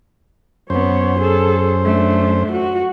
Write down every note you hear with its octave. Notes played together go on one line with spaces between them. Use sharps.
F#2 B3 C5 C#5
G#4 A4
A3 D4
F#4